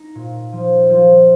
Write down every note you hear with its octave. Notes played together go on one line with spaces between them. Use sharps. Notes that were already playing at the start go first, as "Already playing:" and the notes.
Already playing: D#4
A#2
F3
F3